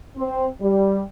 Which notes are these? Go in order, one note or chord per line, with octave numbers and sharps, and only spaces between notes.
C4
G3